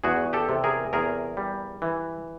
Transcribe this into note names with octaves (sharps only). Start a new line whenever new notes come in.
E2 F#4 G#4
G4 A4
C3
G#4 A#4
E2 G#4 A#4
G3
E3